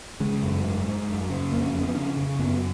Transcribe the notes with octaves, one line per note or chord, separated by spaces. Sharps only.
C#3 G#3
F#2
G#2
G#2
F#2
C#3
F2 A#3
C#4
F2
B3
C#3 C#4
C#3
F#2 B3